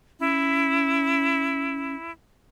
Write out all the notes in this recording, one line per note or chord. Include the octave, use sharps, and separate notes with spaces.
C#4 E4